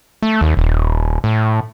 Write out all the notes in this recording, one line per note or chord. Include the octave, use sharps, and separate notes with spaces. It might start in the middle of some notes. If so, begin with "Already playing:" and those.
A3
D#2
D#1
A2